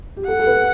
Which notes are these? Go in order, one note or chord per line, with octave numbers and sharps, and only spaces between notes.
G4
A4 F#5
A4
B4